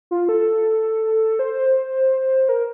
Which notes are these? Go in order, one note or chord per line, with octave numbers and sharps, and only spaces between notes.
F4
A4
C5
A#4